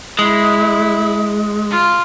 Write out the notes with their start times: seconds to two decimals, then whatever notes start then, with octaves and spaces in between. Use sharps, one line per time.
0.19 G#3 E4
1.70 F4